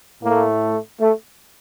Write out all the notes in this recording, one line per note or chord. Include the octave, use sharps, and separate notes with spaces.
A2 A3 A#3
A3